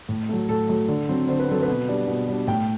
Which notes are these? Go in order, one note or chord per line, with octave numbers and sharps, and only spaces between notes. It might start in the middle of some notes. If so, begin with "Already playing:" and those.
A2
F#3 A3
A2 A4
F#3 A3
D3
F#3 C4
D3 C5
B4
F#3 C4 A4
B4
B2
G3 D4
B2
G3 D4
A2 G5